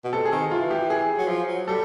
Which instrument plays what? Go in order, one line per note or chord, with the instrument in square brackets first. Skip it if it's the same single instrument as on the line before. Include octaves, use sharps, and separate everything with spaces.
[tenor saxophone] B2
[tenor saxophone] C3 [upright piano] A4
[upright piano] G#4
[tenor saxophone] D#3
[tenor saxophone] E3 [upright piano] F4
[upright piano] G4
G#4
[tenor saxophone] F#3
F3
F#3
[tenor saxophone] G3 [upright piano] A4